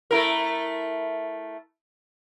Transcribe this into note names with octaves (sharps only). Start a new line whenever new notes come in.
A3 E4 A#4